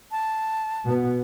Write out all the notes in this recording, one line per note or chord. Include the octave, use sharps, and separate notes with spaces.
A5
B2 B3